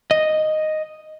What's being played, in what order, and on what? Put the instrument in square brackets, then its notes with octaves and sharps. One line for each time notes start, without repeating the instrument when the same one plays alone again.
[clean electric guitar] D#5